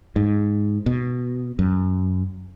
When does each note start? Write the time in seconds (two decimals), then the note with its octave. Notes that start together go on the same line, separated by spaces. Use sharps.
0.16 G#2
0.86 B2
1.59 F#2